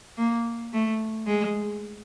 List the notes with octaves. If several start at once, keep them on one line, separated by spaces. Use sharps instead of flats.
A#3
A3
G#3